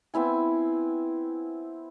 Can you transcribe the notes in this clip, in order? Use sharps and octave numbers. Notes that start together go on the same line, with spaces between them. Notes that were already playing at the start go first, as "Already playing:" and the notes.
B3 C4 E4 G#5